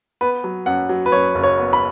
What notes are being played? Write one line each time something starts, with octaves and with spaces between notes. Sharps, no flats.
B3 B4
F#3
F#2 F#5
F#3
B4
F#2 C#5
F#1
C#5
B3
B5